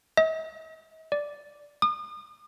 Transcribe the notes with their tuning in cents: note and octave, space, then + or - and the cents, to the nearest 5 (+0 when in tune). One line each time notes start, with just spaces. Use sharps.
D#5 +45
D5 -5
D#6 -40